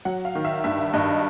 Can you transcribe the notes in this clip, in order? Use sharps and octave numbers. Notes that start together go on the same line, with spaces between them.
F#3 F#5
F5
D#3
E5
G2 E5
G2 D#5